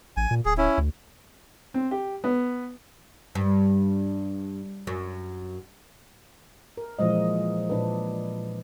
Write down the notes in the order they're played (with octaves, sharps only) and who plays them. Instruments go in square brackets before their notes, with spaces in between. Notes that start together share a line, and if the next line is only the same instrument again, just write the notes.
[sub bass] A1 [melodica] G#5
[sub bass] A#2
[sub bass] D1 [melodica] G#4
[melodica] C#4 E4
[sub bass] D2
[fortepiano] C4
G4
B3
[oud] G2
F#2
[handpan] A#4
A#2 E3 F3 G#3 D#5
A#2 D4 B4